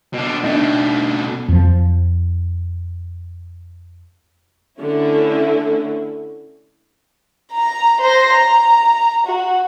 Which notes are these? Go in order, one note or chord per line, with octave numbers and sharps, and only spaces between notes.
B2 D4
B2 A3 D4 D#4
F2 F3
D3 A3 C#4 E4
A#5
C5 A#6
A#5
F#4